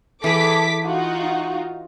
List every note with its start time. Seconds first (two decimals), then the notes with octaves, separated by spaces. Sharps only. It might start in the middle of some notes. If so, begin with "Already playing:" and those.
0.24 E3 G#4 A4 D6 B6
0.84 D#4 F4 F#4